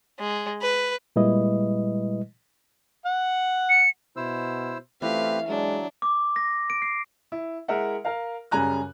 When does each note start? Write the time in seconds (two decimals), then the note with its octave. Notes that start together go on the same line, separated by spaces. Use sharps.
0.19 G#3
0.62 B4
1.16 A#2 G3 G#3 E4 B4 D#5
3.06 F#5
3.69 C#7
4.16 B2 E4 C5 E6
5.02 E3 A3 C4 C#4 F4 G4 B4 F5
5.48 F#3 G#3 D4
6.02 D6
6.36 A#6
6.70 D7
6.82 C7
7.32 E4
7.68 G#3 E4 A#4 E5 F#5
8.05 A#4 F5
8.51 F#2 C#3 G3 G#5 A#5 F#6